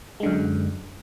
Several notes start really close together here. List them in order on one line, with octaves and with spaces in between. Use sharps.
G#3 D3 F#2